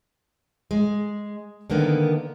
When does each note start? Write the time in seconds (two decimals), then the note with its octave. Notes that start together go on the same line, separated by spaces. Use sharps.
0.71 G#3
1.70 D3 D#3 A#3 B3